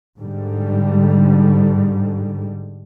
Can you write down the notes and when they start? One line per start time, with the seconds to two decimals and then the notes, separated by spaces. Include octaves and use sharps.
0.18 G#2 D3 G3